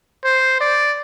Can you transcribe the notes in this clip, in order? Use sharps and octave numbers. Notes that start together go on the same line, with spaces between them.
C5
D5